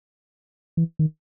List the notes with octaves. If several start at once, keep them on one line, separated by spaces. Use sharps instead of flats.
E3
D#3